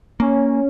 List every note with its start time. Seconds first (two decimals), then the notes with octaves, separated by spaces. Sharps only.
0.20 A#3 C#4